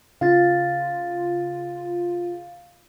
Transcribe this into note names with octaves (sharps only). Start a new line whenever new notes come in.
C#3 F4 F5 A6